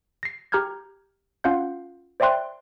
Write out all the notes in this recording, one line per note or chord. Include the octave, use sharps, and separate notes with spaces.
A#6 C7
G4 A#5 F6 G6 G#6
C#4 F4 F5 F#5 G6
C5 D5 E5 G5 C6 F#6